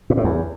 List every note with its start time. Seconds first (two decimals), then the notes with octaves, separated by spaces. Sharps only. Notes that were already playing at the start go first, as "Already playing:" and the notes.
0.10 G#2
0.17 A2
0.24 E2